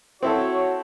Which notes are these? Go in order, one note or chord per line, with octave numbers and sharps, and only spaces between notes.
C4 E4 F#4 A4 C#5